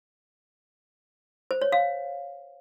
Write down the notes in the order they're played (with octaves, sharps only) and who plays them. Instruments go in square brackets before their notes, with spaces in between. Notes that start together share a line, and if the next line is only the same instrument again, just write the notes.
[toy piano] C5
C#5
F5